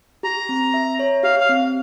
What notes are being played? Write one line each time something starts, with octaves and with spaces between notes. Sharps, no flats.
G4 A#5
C4
E5
C#5
G4 F5
F5
C4